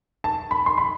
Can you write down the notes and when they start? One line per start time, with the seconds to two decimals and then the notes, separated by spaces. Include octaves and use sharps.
0.24 A5
0.51 B5
0.66 C6
0.78 B5